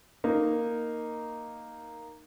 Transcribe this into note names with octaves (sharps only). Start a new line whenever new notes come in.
A#3 D#4